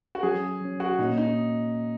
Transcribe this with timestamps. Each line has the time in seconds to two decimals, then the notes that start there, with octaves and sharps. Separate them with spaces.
0.15 F#4
0.23 F#3 C#4 G#4
0.61 F#3 C#4
0.80 F#4
0.99 A#2 A#3 C#4 D#4
1.18 D#4